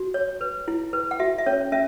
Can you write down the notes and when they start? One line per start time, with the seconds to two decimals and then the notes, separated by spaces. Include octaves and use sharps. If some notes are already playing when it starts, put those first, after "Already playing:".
Already playing: F#4
0.14 C#5
0.41 B4
0.68 E4
0.93 B4
1.11 F#5
1.20 F#4 E5
1.38 E5
1.46 C#4 C#5
1.72 C#4 E5